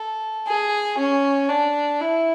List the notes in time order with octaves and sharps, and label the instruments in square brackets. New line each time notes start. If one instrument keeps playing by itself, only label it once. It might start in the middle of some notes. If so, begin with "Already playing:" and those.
Already playing: [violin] A4
G#4
C#4
D4
E4